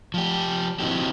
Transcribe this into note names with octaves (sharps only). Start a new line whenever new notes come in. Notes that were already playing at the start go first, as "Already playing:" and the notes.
F3 G4
C4 D#4 E4 F#4 G4